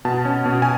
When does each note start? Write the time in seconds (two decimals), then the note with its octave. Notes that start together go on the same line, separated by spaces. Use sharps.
0.05 B2 A5
0.25 C#4
0.46 B2
0.62 G#5